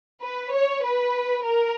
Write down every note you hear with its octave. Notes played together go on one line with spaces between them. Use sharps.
B4
C#5
B4
A#4